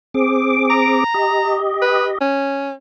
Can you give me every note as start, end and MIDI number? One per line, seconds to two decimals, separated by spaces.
0.14 1.04 60
0.14 1.04 68
0.14 1.04 86
0.70 1.56 82
1.14 2.18 67
1.14 2.18 75
1.82 2.06 71
2.21 2.73 61